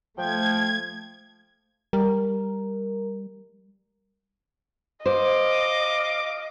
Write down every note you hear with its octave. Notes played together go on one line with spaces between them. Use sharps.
F3 A3 G5 G#6
G3 A#4
C5 D#5 F5 D6